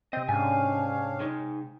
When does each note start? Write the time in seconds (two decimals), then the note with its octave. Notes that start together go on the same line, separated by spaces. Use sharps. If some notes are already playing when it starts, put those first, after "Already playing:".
0.13 C3 C4 D#5 G5
0.28 G#2 C#4 D4 F5 G#5
1.20 G#3 D#4